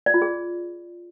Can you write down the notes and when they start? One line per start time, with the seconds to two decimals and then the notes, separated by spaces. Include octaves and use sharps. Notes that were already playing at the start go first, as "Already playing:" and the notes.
0.06 D5
0.14 F4
0.22 G#4